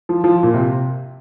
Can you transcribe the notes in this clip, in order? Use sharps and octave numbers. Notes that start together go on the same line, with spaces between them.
F3
F3
A#2
C3